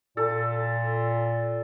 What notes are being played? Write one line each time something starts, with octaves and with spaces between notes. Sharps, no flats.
A#2 A4